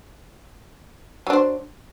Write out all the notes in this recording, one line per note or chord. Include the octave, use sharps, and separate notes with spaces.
F#3 D4 C5